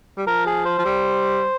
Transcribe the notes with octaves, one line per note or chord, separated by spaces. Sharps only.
G3
F3 A#4
G#4
C5
F3
G3